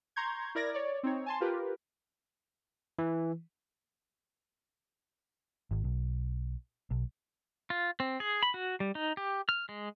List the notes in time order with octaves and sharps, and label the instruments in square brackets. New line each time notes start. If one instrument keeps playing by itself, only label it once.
[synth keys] A#5 C6 C#6 G6 G#6
E4 A#4 D5 G#6 A#6
C#5 D5
C4 D#4 C#5
G#5 A5 C6
F4 G4 A#4 B4
[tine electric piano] E3
[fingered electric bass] G#1
B1
B1
[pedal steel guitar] F4
C4
G#4
B5
F#4
G3
D#4
G4
F6
G#3